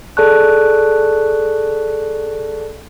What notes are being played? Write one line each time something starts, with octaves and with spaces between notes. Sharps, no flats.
G#4 A4 D5 A5 C#6 F#6